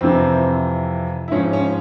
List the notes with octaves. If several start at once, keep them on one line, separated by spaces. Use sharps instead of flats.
F2 C3 E3 C4
E4
G#2 F3 C#4
C#4